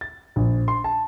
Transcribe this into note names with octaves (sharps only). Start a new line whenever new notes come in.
A6
A#1
C6
A5